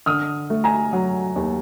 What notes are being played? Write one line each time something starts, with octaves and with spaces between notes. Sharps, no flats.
D3 D#6 F6
A3
G#5 A#5
F#3
D#2